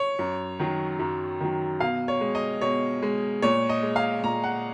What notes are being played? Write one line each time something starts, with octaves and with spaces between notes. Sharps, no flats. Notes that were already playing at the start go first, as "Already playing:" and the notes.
Already playing: C#5
F#2
D#3 F#3
F#2
D#3 F#3
B2 F5
C#5
G#3
D#5
B2 C#5
G#3
A#2 C#5
D#5
G#3
F5
A#2 A#5
F#5